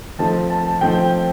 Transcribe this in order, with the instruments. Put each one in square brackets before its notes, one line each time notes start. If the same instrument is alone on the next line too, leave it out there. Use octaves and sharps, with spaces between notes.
[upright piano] F3 A3 C4 D#4 [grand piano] A5
[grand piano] A5
A5
[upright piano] F3 A3 C4 D#4 [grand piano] G5